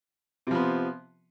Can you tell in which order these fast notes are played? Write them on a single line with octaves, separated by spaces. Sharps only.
C3 F3 B3